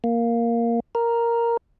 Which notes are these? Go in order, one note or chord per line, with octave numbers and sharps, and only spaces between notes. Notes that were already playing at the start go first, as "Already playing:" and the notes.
A#3
A#4